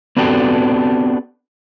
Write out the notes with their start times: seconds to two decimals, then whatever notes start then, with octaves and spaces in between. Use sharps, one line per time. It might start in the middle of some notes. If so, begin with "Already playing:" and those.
0.17 B3 C4 D4 F#4 G4 A4